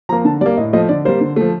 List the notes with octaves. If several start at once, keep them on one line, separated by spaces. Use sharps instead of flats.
F3 A#3 A#5
D3 A5
G3 A#3 D5
A2 D#5
F3 A3 D#5
D3 D5
G3 A#3 C5
D3
F3 A3